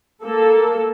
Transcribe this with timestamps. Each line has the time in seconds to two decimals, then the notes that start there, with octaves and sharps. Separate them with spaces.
0.23 A#3 A4